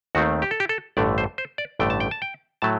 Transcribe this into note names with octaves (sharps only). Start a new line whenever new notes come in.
D#2 D#3 A3 C4 F#4
G4
A4
G4
A4
A1 G2 D3 A3 D5
C5
C5
D5
A1 G2 D3 A3 G5
A5
G5
A5
G5
A2 F#3 A3 A5